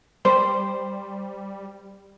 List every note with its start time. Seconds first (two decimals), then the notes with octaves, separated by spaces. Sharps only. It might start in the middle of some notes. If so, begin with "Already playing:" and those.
0.25 G3 C5